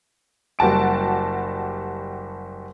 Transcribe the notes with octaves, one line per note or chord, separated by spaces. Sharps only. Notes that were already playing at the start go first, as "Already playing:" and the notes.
F#1 G3 F#4 A5 D7